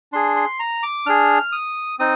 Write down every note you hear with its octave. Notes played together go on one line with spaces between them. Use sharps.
D4 G#4 C6
C6
A#5
D6
D4 G#4 F6
D#6
C4 D#4 D#6